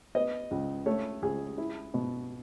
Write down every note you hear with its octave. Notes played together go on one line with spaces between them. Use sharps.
B3 D#5
C#2
A3 C#5
C#2 G#4
E4
B2